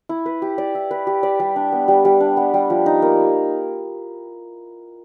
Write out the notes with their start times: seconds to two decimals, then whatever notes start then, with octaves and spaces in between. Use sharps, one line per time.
0.09 E4
0.26 B4
0.42 G4
0.58 D5
0.75 E4
0.91 B4
1.07 G4
1.23 D5
1.40 G3
1.56 D4
1.72 B3
1.88 G3
2.05 G3
2.20 D4
2.37 B3
2.54 G3
2.70 F3
2.86 D#4
3.02 A#3